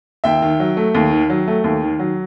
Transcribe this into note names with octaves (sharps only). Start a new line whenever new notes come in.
D#2 E5 G5
D#3
F#3
A3
D#2
D#3
F#3
A3
D#2
D#3
F#3